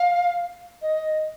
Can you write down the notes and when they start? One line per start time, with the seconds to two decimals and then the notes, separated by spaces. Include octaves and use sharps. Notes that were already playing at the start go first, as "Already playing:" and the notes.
Already playing: F5
0.81 D#5